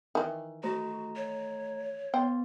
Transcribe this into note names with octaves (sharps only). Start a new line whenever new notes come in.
D#3 E3
A3 F#4 C5 A#5
C#5
B3 C5 G5